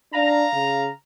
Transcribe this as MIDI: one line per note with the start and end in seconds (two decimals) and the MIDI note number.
0.14 0.46 62
0.14 0.87 77
0.14 0.87 82
0.54 0.89 49